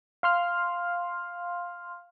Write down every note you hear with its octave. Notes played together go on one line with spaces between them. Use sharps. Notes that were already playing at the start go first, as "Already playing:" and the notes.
F5 C6 F6